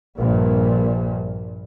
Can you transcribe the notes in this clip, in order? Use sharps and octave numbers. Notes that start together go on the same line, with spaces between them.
A#1 G2 A#2